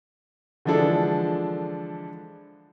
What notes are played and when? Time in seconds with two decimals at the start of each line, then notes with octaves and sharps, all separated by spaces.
0.65 D3 E3 F3 G#3 D4 A4